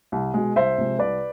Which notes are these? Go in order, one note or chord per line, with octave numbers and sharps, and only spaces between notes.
C2
B2 G#3
C2 C5 E5
C3 F3 G#3
C2 B4 D5